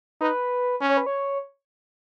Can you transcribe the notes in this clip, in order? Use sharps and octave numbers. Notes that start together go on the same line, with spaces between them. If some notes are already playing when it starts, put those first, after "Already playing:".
D#4 B4
C#4
C#5
B4
C#5